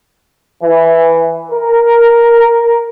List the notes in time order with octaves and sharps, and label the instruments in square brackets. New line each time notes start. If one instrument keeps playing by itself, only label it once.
[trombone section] E3
A#4